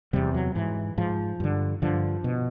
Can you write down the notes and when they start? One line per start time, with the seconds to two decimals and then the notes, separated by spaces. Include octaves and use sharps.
0.13 E2 C3 G3
0.34 F#3
0.55 G#2 E3
0.98 G#2 F3
1.40 G2 D3
1.82 G2 D3 F3
2.24 B2